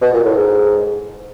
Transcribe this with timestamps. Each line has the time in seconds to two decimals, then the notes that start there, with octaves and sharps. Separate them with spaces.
0.01 B2
0.13 A#2
0.25 A2
0.36 G#2